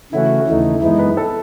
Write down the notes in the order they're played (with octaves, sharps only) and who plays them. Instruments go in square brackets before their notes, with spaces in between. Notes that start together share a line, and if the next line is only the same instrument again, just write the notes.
[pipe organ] C#3 E3 A3 C#4 F#4 [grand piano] E4
[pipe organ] D#2 C#3 E3 A3 D#4
[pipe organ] F#2 E3 G#3 B3 D#4 [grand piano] E4
[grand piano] B4
A4